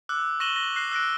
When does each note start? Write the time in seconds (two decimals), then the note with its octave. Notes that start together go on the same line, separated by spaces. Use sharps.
0.09 D6 E6 F#6
0.40 C#6 A#6 D#7 E7 F#7 G7
0.56 A#6
0.76 F#6 A#6 C7
0.91 E6 F#6 A#6 D7